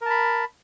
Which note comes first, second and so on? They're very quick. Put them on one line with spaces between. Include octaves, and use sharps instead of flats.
A#4 A5 B5